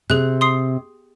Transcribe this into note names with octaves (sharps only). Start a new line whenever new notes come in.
C3 G#4 F#6
C6 D#6 C7